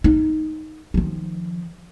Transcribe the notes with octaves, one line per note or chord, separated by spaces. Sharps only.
D#4
D#3 F3